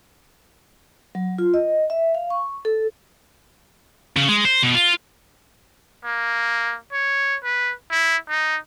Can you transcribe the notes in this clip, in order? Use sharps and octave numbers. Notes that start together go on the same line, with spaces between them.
F#3
F4
D#5
E5
F5
C#6
A4
C#3
G#3
C5
B2
F4
A#3
C#5
B4
E4
D#4